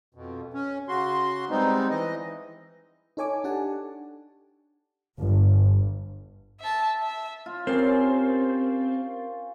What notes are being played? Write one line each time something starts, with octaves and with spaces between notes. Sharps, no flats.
F2 B2
C#4
C#3 F#4 C6
G3 G#3 B3 C4 D#4
E3 D#5
D#4 A4 C#5 G#5 D6
D4 G4 A4 F#5 G#5 A5
G1
E5 A5
E5
F4
C4 C#4 G4 A#4 C5 A6 C7